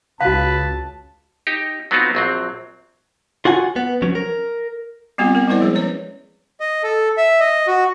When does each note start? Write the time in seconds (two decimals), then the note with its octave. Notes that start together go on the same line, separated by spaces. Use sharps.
0.21 C#2 C#3 F#4 B4 F5 A5
1.47 D#4 G4
1.91 F#3 B3 C4 D#4 F4 F#4
2.15 A#1 F#3 C4
3.45 F4 F#4 F#5 G#5
3.76 B3
4.02 F3 F#3 C#4
4.15 A#4
5.18 G3 B3 C4 F4 G4
5.34 B3 A#4
5.48 G3 B3 E4 C5 D5
5.60 F3 G#3 G#4
5.75 C#4 B4 C#5
6.60 D#5
6.83 A4
7.18 E5
7.40 D#5
7.67 F#4